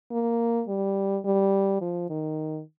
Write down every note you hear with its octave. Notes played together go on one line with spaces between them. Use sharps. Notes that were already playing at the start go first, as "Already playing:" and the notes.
A#3
G3
G3
F3
D#3